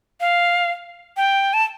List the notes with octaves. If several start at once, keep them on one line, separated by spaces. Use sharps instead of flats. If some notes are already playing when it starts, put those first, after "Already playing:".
F5
G5
A5